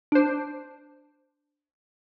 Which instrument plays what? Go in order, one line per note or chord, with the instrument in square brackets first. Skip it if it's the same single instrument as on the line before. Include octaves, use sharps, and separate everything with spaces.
[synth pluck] D4 C5